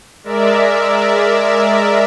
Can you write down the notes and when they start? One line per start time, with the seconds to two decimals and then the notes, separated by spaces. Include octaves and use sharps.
0.24 G#3 A#4 D5 E5